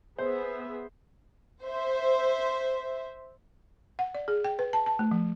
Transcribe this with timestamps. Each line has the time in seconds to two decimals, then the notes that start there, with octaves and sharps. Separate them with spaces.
0.19 B3 G#4 C5 E5
1.63 C5 E5
3.99 F#5
4.15 D5
4.28 G#4
4.45 G5
4.59 B4
4.73 A5
4.86 A5
4.99 A3
5.11 F3